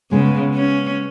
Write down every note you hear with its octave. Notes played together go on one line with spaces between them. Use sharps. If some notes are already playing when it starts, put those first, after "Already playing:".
C#3 G#3 B3 B4
C#4